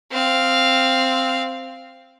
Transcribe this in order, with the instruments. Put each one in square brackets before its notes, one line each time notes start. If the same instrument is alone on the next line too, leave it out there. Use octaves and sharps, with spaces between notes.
[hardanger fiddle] C4 F5